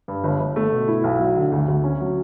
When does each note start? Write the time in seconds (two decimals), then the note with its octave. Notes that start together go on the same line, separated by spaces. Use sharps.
0.08 G2
0.24 G1
0.40 G1
0.56 A3
0.72 B2
0.88 E4
1.04 B1
1.20 F#3
1.36 D3
1.52 D2
1.68 D2
1.84 C#4
2.00 F#3